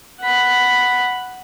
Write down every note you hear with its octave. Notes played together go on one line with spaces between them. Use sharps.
F#5 B5